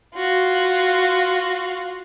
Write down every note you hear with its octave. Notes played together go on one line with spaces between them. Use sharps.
F4 F#4